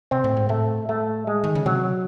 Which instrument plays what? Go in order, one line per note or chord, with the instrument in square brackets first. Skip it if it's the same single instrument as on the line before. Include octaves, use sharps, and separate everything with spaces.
[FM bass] C3 [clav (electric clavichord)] C4
[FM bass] A2
G#2
[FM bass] A2 [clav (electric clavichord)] A3
[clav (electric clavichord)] A3
G#3
[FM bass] D#3
C#3
[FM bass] C3 [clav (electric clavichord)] F#3